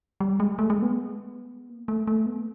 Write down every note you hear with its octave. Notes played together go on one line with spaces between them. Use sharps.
G3
G#3
A3
G#3
B3
A#3
A3
A3
B3